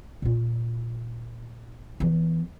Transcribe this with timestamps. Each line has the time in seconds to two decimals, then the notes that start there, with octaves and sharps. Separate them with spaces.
0.22 A#2 F4
2.00 E3 B3